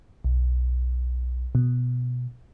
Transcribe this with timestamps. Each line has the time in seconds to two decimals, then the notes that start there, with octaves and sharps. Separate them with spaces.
0.25 B1
1.55 B2